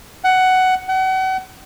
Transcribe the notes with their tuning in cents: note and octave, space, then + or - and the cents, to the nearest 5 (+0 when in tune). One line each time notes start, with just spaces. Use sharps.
F#5 +10
F#5 +35